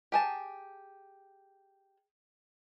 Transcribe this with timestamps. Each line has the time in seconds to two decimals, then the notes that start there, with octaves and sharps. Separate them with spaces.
0.12 G4 G#4 A5